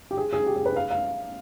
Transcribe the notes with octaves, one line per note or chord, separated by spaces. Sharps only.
G4
G#4
G#4
G4
G#4
B4
F5
F5